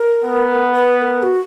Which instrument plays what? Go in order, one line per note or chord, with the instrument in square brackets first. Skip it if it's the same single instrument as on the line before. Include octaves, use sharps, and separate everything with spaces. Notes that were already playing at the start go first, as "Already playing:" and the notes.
Already playing: [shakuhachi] A#4
[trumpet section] B3
[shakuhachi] B4
B4
A#4
F#4